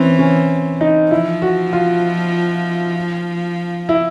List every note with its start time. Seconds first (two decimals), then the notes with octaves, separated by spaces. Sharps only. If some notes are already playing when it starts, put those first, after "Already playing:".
Already playing: E3 C4 C#4
0.19 C#4
0.81 D#4
1.11 F3 E4
1.42 F#4
1.73 F4
3.89 E4